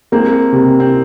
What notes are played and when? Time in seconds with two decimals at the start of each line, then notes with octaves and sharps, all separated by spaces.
0.12 G#3 A#3 C4
0.52 C3
0.80 C4